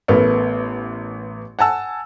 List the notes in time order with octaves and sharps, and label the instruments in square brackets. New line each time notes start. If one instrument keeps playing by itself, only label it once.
[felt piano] A1 A3 B3 A#4
F#5 G#5 A5 E6